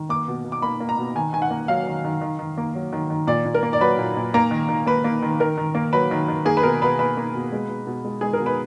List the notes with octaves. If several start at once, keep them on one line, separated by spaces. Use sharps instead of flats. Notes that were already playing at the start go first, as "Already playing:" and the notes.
Already playing: D#3
A#3 D6
B2
B2
D6
A#3 B5
A#3
A#5
B2
D#3 G#5
D#3 G#5
F#5
A#3
F#3 F5
D#3
D#3
D#3
D#3
A#3
F#3
D#3
D#3
A#2 D5
A#2
A#4
A#3
D5
F#3 B4
A#2
A#2
A#3 A#5
D#3
D#3
A#3 B4
A#3
D#3
D#3 A#4
D#3
A#3
F#3 B4
D#3
D#3
A#3 G#4
B4
B2 A#4
B2 B4
A#3 B4
A#3
B2
G#3
B2
B2
G#3
G#3 G#4
A#4
B2
B4